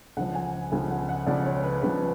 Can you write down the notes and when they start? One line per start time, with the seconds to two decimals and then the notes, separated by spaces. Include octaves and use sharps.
0.17 C#2 C#3 F3 F#5
0.35 G#5
0.72 C#2 C#3 F3 G#5
0.91 F#5
1.09 F#5
1.27 C#2 C#3 F3 D5
1.46 C#5
1.64 B4
1.82 C#2 C#3 F3 B4